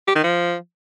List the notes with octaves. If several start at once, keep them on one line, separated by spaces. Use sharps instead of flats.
G4
D#3
F3